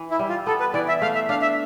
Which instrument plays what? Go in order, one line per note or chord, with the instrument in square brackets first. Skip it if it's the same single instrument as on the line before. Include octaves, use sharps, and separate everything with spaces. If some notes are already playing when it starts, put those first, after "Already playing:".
Already playing: [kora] E3
[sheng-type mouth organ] E4
[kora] G3
[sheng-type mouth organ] F4
[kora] B3 [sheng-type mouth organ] A4
[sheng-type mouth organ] B4
[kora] E3 [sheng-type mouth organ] D5
[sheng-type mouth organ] E5
[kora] A3 [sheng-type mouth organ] F5
[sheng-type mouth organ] E5
[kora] D4 [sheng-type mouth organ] F5
[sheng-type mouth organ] E5